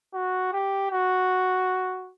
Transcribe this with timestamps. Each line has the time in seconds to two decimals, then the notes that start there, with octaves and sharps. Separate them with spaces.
0.13 F#4
0.53 G4
0.92 F#4